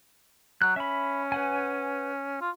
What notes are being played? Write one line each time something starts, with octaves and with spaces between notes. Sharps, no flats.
F#3 F#6
C#4 E5 B5
B4 F#5 G#5
F4